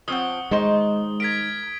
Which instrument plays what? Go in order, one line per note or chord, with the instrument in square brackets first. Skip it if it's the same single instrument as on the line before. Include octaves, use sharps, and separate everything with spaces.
[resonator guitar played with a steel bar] F3 C4 [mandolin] C#5 F#5 [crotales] D#6 G7
[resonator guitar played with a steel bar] D#3 D#4 C5 [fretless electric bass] G#3
[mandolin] A#4 [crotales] G#6 B6 D7